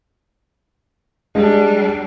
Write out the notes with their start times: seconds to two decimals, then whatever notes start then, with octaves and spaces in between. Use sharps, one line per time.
1.35 G3 G#3 D4